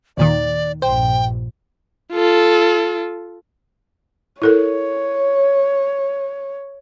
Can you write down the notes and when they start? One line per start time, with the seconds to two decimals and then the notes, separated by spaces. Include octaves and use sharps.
0.17 D#2 A#2 D#3 D5
0.82 A#1 G2 C5 G5
2.13 F4 A4
4.42 E4 A4 A#4 C#5